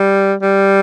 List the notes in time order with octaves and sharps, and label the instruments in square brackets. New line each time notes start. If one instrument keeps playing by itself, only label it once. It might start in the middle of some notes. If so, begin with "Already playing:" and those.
Already playing: [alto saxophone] G3
G3